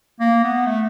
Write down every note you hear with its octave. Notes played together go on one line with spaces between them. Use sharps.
A#3
B3
A3